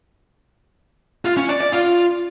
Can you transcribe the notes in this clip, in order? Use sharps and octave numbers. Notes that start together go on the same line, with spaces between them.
F4
C#4
D5
D5
F4